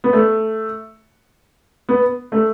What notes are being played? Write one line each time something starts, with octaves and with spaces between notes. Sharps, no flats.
B3
A3
B3
A3